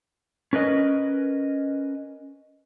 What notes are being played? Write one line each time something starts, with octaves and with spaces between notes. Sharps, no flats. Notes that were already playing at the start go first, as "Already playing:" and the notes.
C#4 A#4 B4 D#5